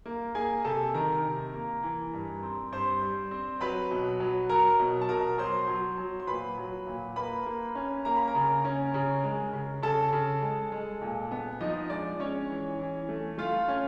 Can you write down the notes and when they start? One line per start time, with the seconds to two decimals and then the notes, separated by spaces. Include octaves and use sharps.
0.06 A#3
0.35 A#3 G#4 G#5
0.64 C3 A4 A5
0.94 D#3 A#4 A#5
1.24 C3
1.54 A#3
1.83 E3
2.13 G2
2.43 C4
2.72 G2 C5 C6
3.02 G3
3.31 C4
3.60 F#3 B4 B5
3.91 B2
4.20 F#3
4.49 F#3 A#4 A#5
4.79 B2
5.01 A5
5.09 B2 A#4 A#5
5.38 F#3 C5 C6
5.68 F#3
5.98 F#3
6.20 C6
6.27 A#2 B4 B5
6.58 F#3
6.87 A#2
7.16 A#3 B4 B5
7.46 A#3
7.75 C#4
8.05 A#3 A#5
8.16 B5
8.27 A#4 A#5
8.35 C#3
8.64 C#4
8.94 C#3
9.24 G#3
9.53 C#3
9.82 C#3 A4 A5
10.13 C#3
10.42 G#3
10.72 G#3
11.02 A#2
11.31 B3
11.61 F3 D#4 D#5
11.90 G#3 D4 D5
12.20 G#3 C#4 C#5
12.50 E3
12.79 E3
13.09 A3
13.38 A3 F4 F5
13.68 C#4